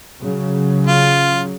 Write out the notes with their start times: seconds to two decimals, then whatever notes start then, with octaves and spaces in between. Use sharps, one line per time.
0.20 C#3 F#3
0.87 F4